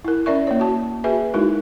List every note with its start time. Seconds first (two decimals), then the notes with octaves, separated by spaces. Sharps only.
0.05 E4 A#4
0.26 C#4 A#4 D5 E5 C#6
0.47 A#3 C#5
0.60 F#4 A5
1.04 F#4 G#4 B4 E5 G#5
1.34 G#3 D#4 E4 F#4 A#4